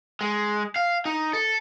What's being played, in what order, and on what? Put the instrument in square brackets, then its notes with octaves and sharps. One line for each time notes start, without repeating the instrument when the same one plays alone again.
[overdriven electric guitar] G#3
F5
D#4
A4